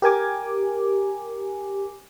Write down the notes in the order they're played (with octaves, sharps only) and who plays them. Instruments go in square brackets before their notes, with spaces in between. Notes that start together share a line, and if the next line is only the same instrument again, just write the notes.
[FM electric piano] G4 A#4 G#5 D6